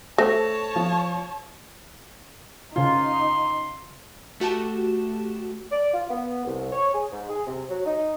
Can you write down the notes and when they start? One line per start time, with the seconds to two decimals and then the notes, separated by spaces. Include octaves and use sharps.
0.18 A3 C5 C#5 A5 A#6
0.76 F3
2.76 C#3 D#4 F4 C6
4.40 A3 F#4 G4 A5 E7
5.71 D5
5.94 F4
6.10 B3
6.45 C2
6.73 C#5
6.94 G#4
7.12 G#2
7.29 G#4
7.47 C3
7.69 F#3
7.86 D#4